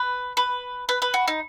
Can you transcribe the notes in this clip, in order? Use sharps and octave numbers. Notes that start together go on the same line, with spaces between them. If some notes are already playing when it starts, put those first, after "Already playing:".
Already playing: B4
B4
B4
B4
F#4
D#4